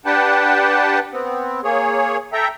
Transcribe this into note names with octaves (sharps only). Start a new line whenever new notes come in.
D4 G4 B4 F#5 G5 A5
B3 C4
A#3 G#4 C#5
A4 E5 G5 A#5